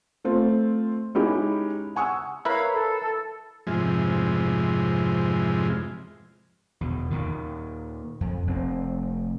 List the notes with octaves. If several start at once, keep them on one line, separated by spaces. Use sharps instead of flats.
A3 C4 F4
G#3 C#4 D#4 E4 G4
F#5 G#5 C#6 D#6 E6
E4 A#4 B4 C#5 F5 B5
A4
F2 G#2 C3 E3 F3 G#3
E2 B2
D#2 A#2 D#3
F2
F1 C4